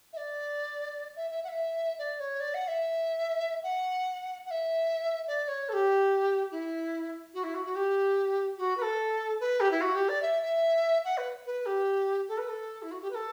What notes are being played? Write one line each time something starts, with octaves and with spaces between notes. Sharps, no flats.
E5
D5
E5
E5
F#5
E5
D5
C#5
D5
F#5
E5
F#5
F#5
E5
D5
C#5
A4
G4
E4
F#4
E4
F#4
F#4
G4
F#4
B4
A4
B4
G4
E4
F#4
G4
D5
E5
E5
F#5
B4
B4
G4
A4
B4
A4
E4
F#4
G4
B4
A4